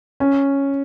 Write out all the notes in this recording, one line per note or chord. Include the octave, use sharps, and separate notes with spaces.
C#4